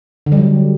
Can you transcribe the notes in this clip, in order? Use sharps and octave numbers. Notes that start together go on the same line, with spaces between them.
D3
G3
F#3